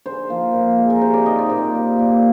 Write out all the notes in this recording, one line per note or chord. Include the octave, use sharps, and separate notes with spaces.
D3 C5
F3 A#3
A#2
G#3
A#4
C3 C5
D5
D#3 G3 D#5
D5
A#2 C5
G3 A#3
A#2